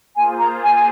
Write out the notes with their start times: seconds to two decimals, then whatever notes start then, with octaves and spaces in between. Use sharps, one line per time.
0.16 A#3 F4 G#4 C5 G#5
0.39 A#5
0.63 G#5
0.74 G#5